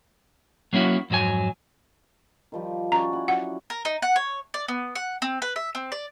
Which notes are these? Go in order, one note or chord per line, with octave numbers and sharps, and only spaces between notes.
F#3 A#3 C#4 E4 F#4
F2 G#2 F#3 E4 G#5
D#3 F3 G3
C#4 F#4 D5 A#5
E4 F#5
F#3 F#5
A#4
D#4
F#5
C#5
D5
B3
F#5
C4
B4
E5
C4
D5